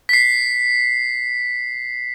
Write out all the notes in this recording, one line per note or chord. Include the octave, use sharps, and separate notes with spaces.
B6 C7